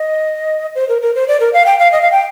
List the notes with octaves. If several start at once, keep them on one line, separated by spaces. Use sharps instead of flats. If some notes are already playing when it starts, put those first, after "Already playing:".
Already playing: D#5
C5
A#4
A#4
C5
D5
A#4
F5
G5
F5
D#5
F5
G5